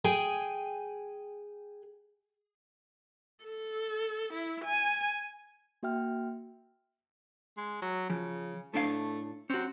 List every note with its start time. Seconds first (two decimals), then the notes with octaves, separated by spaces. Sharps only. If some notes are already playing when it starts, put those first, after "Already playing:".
0.04 G#4 G5 G#5
3.44 A4
4.33 E4
4.64 G#5
5.83 A#3 F#4 E5 G5 F6
7.57 G#3
7.82 F#3
8.10 C#3 F3
8.74 A2 A3 D4 F5
9.50 C4 C#4 F#4